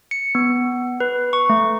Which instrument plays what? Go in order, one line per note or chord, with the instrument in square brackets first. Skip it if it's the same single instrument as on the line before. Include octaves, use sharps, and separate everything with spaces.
[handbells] C#7
B3
B4
C#6
A3